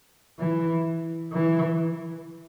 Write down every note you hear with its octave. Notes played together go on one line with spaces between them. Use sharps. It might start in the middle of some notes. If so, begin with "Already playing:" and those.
E3
E3